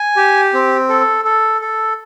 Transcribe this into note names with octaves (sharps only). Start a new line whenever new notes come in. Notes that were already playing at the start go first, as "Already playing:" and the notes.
Already playing: G#5
G4
C4
A4
A4
A4